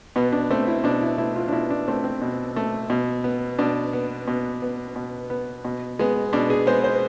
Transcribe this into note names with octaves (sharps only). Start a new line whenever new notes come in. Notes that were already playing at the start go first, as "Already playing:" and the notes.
B2 B3
D4
A3 C4
E4
B2 D4
E4
A3 E4
F4
D4
B2 E4
D4
A3 C4
C4
B2
A3
B2
B3
B2 D4
B3
B2
B3
B2
B3
B2
G#3 B3
B2 D4
G#4
G#3 B3 C5
C5